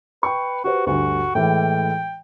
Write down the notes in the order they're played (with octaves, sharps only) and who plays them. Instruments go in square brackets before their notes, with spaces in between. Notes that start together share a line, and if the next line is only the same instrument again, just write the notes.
[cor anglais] B4 [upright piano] G5 C#6
[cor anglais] F#4 [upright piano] G4 B4 C5
[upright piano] D2 G2 [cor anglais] F#4
[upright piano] A2 E3 G#3 [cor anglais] G5